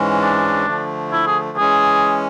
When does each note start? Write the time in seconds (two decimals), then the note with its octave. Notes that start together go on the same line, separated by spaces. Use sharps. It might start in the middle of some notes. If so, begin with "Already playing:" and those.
Already playing: G#2 E3 G#3 C#4
0.21 D4
0.67 D3 F3 A3
1.13 E4
1.27 G#4
1.57 E3 G#3 C#4 G#4